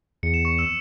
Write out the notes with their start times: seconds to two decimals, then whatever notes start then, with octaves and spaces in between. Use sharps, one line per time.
0.23 E2 C#7
0.34 E7
0.45 C#6 C#7
0.58 E6 E7